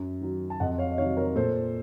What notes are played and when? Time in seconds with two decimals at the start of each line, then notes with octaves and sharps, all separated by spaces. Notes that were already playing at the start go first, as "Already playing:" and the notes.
Already playing: F#2
0.21 D#3 F#3
0.50 A5
0.60 F2 D#5 F#5
0.78 C#5 F5
0.92 D#5
0.98 C3 D#3 F#3 C#5 F5
1.17 A#4 C#5
1.35 A#2 A4 C5